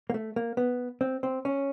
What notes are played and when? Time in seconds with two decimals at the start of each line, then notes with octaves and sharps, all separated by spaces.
0.10 A#3
0.14 A3
0.36 A#3
0.57 B3
1.01 C4
1.23 C4
1.45 C#4